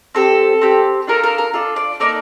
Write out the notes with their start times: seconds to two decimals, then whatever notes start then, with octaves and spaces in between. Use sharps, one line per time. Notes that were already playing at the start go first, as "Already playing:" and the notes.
0.15 C4 G4 A4
0.61 C4 G4
1.07 D4 F4 A4 A#4
1.24 A#4
1.38 A#4
1.53 D4 F4 A4
1.76 D5
2.00 A#3 D#4 A4 D5